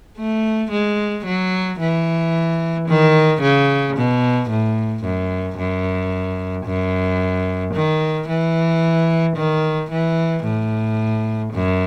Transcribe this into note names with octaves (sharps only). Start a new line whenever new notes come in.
A3
G#3
F#3
E3
D#3
C#3
B2
A2
F#2
F#2
F#2
D#3
E3
D#3
E3
A2
F#2